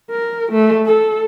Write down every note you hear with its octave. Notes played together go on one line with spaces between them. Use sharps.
A#4
A3
A4